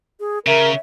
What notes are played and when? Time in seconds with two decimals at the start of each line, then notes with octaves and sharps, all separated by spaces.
0.20 G#4
0.46 C#3 A#4 E5